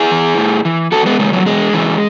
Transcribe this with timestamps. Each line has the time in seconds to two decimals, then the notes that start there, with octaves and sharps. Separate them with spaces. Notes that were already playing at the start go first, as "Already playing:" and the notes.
Already playing: E4 G#4
0.11 E3
0.38 A2
0.65 E3
0.92 E2 F#4 A4
1.06 G#3 B3
1.19 C#3 E3 G#3
1.33 F#3
1.46 E2 G#3
1.73 C#3 E3